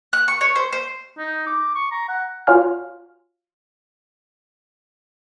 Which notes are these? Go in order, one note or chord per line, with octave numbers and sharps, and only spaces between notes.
F#6
C#6
C#5
C5
C5
D#4
D6
C#6
A#5
F#5
F4 F#4 C#5 F5 G#5 F6